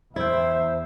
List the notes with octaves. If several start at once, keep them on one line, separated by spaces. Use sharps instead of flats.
E2 E4 C5 E5 G5